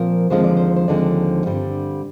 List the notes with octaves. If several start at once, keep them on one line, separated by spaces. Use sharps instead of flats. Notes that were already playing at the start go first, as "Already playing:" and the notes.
Already playing: A#2 F3 C4 A#4
D#2 D3 F3 G#3 C4 C5
D5
C5
C5
D#2 D3 F3 G#3 C4 D5
G2 D3 G3 C4